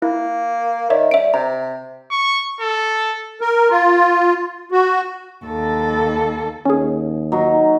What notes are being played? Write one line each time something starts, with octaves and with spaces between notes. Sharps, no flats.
A#3 E4
D#3 C#5 D5 E5
G3 E5 D7
C3 A#5
C#6
A4
A#4
F4
F#4
D#2 A4
D#2 C#4 G#4
F#3 D#4